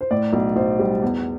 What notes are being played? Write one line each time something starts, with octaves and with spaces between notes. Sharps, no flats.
C5
A2 D5
B1
B1 C5
G3
E2